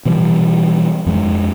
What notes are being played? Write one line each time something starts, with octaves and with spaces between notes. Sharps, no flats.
B2 E3 F3 G3
F2 F3 G#3